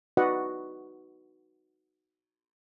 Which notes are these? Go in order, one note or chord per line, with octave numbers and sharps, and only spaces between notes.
D#4 F#4 B4 D5 D#5 F#5